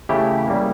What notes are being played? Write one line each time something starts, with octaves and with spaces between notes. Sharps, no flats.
C#3 E3 A3 E4 G4
C#3 G3 A#3